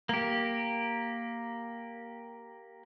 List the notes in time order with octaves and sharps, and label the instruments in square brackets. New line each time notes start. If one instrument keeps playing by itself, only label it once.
[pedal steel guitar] A#3 G4